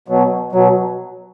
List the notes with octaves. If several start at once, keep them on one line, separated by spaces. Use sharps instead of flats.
B2 F#3
B2 F#3